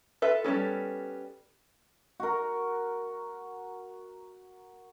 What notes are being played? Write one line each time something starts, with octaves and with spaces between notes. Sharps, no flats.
F4 A4 B4 E5
G3 B3 C#4 A4
F#4 A#4